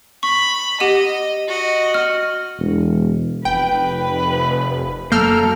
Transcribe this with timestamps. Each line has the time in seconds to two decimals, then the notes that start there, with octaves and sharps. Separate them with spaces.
0.23 B5 C#6
0.80 G4 D#5 F#5 D#7
1.47 F#4 D#5
1.94 F6
2.59 E1
3.45 F1 B4 G5
5.12 F#2 A#3 A4 A#5 E6 F6 G6